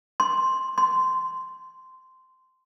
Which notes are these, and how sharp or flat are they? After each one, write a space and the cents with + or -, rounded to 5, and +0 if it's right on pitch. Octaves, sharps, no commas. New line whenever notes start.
C6 +10
C6 -10